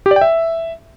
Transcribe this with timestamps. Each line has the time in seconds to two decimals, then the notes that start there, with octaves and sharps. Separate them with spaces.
0.06 G4
0.11 D5
0.16 G5
0.21 E5